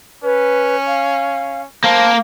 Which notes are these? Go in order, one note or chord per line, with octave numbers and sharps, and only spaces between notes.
C#4 B4
F5
A#3 C5 A5